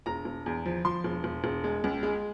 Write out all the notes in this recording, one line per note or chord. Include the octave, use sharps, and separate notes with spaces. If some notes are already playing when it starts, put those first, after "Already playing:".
E1 A#5
E1
E2
F3
F3 C6
E1
E1
E1
G#3
C#2
G#3